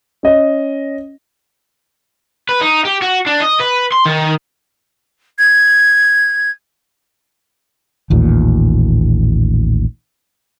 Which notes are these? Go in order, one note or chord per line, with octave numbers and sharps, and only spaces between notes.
C#4 D#5
B4
D#4
G4
F#4
D4
D#5
B4
C6
D#3
G#6
A1 D#2 A#2